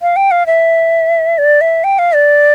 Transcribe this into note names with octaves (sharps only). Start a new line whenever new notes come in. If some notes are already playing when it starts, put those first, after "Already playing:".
F5
G5
F5
E5
D5
E5
G5
F5
D5